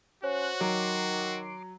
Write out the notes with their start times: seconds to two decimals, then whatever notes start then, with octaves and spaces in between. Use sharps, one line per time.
0.24 C#4 F#4 C5 C#5 F#6
0.61 D#3 F#3 C6 D6